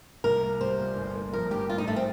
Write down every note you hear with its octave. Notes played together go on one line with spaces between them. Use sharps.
C2 A#4
A#3
G3 C5
A#2
G1
A#3
F3 A#4
G2 G4
A2 F4
D#4
A3 A#4
C4